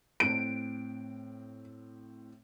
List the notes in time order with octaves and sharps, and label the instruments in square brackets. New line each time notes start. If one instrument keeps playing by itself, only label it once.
[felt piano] A2 C4 [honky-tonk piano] D7